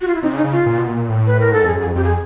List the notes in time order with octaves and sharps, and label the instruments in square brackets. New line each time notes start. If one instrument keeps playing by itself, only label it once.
[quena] F#4
F4
E4
[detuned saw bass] C3 [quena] D#4
[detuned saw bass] C#3
[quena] D#4
[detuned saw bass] C#3
[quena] F4
[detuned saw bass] A#2
B2
A#2
A2
[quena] B4
A#4
[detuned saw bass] G#2 [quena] A4
[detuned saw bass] F2 [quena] G#4
[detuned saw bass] F#2
[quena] G#4
[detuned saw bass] F2
[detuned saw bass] F2 [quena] G4
[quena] G#4